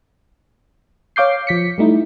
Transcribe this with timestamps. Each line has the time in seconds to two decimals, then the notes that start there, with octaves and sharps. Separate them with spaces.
1.16 C#5 F5 D6 G6 C7
1.47 F3 B6 C#7
1.78 G3 A3 D#4 E4